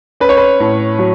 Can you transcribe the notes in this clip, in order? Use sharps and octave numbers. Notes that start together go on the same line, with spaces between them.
C#4 B4
C#5
B4
A2
F#3